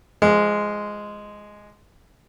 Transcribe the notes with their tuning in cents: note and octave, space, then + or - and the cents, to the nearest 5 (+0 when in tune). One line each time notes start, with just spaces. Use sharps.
F3 -20 G#3 +0